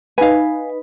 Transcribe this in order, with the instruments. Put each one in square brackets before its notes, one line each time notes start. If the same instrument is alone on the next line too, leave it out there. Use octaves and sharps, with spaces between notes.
[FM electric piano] D#4 B4 [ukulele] F5 G#5